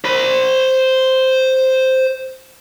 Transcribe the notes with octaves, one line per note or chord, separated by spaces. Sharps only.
C5 B5